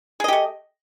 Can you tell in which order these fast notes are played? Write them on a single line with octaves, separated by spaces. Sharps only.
G#4 D#5 G4 A3